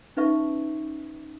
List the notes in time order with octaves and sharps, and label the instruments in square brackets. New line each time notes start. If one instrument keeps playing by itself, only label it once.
[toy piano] C#4 D#4 B4 E5 C#6